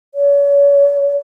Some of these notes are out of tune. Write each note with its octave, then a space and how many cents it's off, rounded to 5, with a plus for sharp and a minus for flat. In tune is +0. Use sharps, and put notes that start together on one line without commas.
C#5 +40